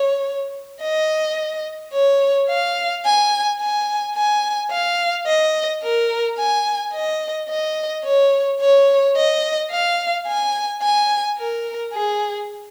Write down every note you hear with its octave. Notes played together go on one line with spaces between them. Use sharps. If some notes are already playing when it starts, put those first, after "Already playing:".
Already playing: C#5
D#5
C#5
F5
G#5
G#5
G#5
F5
D#5
A#4
G#5
D#5
D#5
C#5
C#5
D#5
F5
G#5
G#5
A#4
G#4